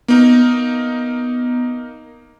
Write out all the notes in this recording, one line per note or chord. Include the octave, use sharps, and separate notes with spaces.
A#3 B3 D#4 A#4